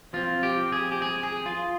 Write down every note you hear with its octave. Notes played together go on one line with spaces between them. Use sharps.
F3 C4 F4
G4
G#4
G4
G#4
G#4
F4